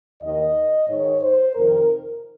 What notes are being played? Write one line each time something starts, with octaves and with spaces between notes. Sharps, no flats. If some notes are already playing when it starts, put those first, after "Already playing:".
D#2 D#3 D#5
G#2 D#3 C#5
C5
F2 C3 D#3 A#4